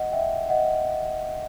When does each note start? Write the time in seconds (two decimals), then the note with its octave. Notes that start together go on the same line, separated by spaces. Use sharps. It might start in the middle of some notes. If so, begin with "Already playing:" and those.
Already playing: D#5 F#5
0.12 E5 G5
0.49 D#5 F#5